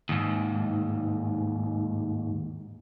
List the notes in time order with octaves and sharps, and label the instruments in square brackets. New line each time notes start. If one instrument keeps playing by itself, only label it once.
[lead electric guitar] D#2 G#2